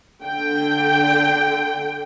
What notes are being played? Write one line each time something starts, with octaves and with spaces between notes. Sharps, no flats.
D3 G5